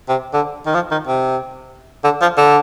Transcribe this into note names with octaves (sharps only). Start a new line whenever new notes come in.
C3
D3
D#3
F3
D#3
C3
D3
F3
D3